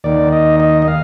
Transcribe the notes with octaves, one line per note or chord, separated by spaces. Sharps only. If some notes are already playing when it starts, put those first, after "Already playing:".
D#2 D#3 D5
D#5
D#5
D#5
F5